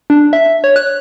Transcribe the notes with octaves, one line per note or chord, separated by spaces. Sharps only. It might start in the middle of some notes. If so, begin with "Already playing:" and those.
D4
E5
C#5
F#6